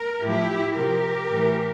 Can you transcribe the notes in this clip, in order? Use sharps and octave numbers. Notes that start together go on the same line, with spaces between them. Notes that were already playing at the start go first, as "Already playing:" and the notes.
Already playing: A#4
A2 F3 E4 G4
C3 F3 G4 A#4
A2 E3